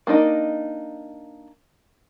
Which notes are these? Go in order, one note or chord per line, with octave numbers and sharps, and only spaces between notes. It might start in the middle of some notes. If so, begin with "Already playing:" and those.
A#3 D4 D#4 D#5